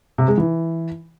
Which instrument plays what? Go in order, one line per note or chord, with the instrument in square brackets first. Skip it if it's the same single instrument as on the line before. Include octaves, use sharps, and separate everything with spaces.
[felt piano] C3
G#3
E3